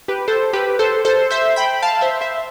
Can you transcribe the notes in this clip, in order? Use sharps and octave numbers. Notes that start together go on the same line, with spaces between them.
G4 B4
A4 C5
G4 B4
A4 C5
A4 C5
C5 E5
G5 B5
F5 A5
C5 E5
C5 E5